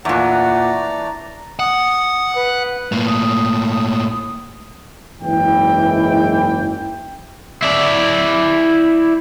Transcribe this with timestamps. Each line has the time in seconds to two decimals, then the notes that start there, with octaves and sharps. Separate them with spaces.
0.05 E2 A#2 E3 A3 D4 D5 F#5 A#5
1.59 F#5 D#6
2.35 B4
2.92 A2 A#3
3.07 D#6
5.21 F#1 G#2 E3 G5
7.62 E4 D5